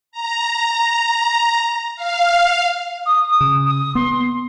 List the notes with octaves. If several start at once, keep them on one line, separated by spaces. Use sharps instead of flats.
A#5
F5
D#6
D#6
C#3
D#6
B3 C6